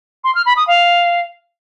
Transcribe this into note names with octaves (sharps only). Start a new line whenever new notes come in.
C6
F6
B5
D#6
F5